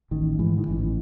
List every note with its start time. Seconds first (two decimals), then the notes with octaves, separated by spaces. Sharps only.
0.11 A1 D#3
0.39 G#2 E3
0.58 D#3
0.67 A1 E3